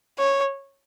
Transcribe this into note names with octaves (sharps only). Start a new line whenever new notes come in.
C#5